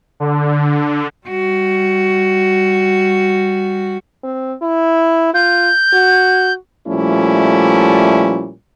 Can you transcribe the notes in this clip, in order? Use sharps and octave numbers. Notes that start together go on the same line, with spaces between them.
D3
G3 F#4
C4
E4
F4 G6
F#4
A#2 F3 G3 A3 C#4 E4